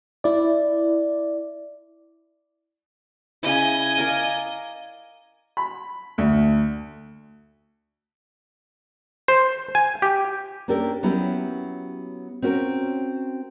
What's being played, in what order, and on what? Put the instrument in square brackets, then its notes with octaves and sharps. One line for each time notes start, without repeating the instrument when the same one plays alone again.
[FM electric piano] E4 D5
[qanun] C#3 E4 [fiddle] D#5 G#5
[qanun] A#4 D5 F5
[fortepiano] B5
D2
[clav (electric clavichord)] C5
G#5
G4
[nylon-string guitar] A#3 C#4 D4 G4 A4 A#4
F#3 B3 C#4 E4 G4
C4 C#4 F#4 A#4